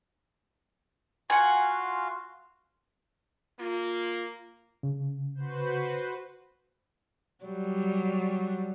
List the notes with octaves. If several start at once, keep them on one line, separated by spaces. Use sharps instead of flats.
F4 F#4 F5 F#5 G#5
A#3 F4
C#3
F#4 B4 C5
F#3 G3